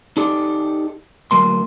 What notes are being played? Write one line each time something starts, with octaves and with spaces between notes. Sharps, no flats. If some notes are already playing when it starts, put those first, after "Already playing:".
D#4 G4 A4 D5
D2 F#3 A#3 C6